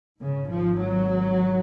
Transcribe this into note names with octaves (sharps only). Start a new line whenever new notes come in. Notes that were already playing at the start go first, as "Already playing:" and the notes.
G#1 G#2 C#3
F3
F#3